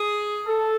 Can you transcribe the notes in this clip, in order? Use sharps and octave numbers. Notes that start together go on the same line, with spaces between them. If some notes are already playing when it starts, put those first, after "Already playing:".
Already playing: G#4
A4